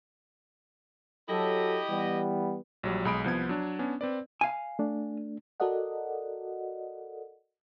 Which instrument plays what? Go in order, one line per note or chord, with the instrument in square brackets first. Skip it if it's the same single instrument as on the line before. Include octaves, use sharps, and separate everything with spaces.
[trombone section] F#3 A4 [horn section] E4 G4 D#5
[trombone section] E3 G3 B3
[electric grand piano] A#1 F#3 G3
B1 G#3 B5 D#6 D7
C2 F3 B3 G#6
F#3 D4
B3 C#4 D4
C4 B4 D5
[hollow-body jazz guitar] F5 G#5
[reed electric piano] A3 D4
[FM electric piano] F#4 A4 A#4 D5 D#5 F#5